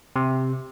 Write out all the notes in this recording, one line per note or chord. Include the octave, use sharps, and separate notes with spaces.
C3